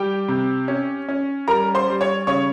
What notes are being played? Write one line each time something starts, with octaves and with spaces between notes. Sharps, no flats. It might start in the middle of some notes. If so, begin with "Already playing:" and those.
Already playing: G3 G4 G5
C3
C#4
C#4
G3 A#4 A#5
C5 C6
G3
C#5 C#6
C#3 C#5 C#6